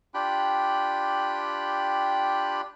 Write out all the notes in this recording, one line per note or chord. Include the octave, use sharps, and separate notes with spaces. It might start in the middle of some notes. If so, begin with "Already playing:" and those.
D4 F4 G4 G5 B5 F#6